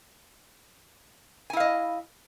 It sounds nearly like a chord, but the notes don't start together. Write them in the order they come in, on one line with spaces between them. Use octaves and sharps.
G#5 E4 F5 D#5